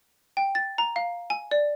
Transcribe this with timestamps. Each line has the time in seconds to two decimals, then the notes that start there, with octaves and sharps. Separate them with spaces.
0.37 G5
0.55 A6
0.78 A#5
0.96 F5
1.30 G#5
1.51 D5